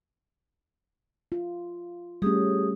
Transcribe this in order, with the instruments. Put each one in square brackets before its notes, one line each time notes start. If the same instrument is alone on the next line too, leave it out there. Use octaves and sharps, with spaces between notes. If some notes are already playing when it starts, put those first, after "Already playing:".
[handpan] F4
[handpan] G3 A3 C#4 [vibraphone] G4 G#4 D#6